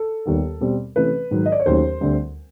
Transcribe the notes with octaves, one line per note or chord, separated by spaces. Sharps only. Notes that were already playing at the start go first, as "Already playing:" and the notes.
Already playing: A4
D#2 D#3 G3 B3
B2 G3 C4
C3 E3 A3 C#4 B4
G#2 D#3 F#3
D#5
D5
C#5
D#2 D#3 F#3 A3 C#4 C5
D2 D3 G3 C4